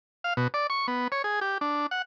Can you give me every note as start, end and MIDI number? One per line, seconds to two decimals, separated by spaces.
0.24 0.34 77
0.37 0.48 47
0.54 0.67 74
0.70 0.87 85
0.88 1.08 59
1.12 1.22 73
1.24 1.40 68
1.41 1.58 67
1.61 1.87 62
1.91 2.02 78